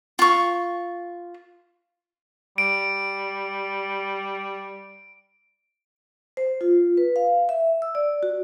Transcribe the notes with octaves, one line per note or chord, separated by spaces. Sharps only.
F4 C#6
G3 D7
C5
F4
B4
F5
E5
E6
D5
F#4